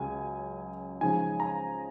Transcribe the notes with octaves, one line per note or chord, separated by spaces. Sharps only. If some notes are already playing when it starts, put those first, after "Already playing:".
Already playing: C#2 C#3 F#3 G#5
C#3 F3 G#3 D#4 G#5
A#5